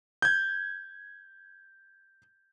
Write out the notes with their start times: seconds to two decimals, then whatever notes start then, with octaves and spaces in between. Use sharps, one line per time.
0.22 G6 G#6